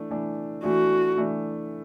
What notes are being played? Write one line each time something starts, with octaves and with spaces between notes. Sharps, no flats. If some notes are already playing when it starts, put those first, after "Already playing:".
Already playing: E3 A3 D4
E3 A3 D4
E3 A3 D4 F#4
E3 A3 D4